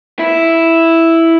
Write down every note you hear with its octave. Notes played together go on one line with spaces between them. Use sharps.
E4